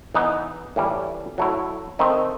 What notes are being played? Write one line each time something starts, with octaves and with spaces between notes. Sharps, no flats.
E3 B3 D#4
A2 E3 G3
F#3 A3 E4
D#3 A3 C4 D#4